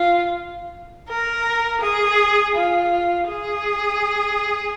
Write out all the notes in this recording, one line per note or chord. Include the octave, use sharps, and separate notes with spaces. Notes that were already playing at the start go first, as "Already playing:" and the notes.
Already playing: F4
A#4
G#4
F4
G#4